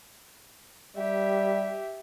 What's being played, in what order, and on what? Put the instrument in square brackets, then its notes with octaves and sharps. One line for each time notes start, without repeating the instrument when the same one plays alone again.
[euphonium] G3 [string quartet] G4 E5